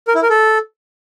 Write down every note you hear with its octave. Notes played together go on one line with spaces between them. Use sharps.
A#4
E4
A#4
A4